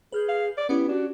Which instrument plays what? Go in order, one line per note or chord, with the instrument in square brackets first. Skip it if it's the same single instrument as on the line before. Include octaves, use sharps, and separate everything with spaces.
[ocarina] G#4 [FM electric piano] B4 F6 G6
[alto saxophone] F5
D5
[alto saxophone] B3 [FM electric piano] C#4 G4 [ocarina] E4
[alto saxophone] D4 [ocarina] F#4